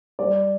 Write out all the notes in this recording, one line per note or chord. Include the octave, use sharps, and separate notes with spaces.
G3 D5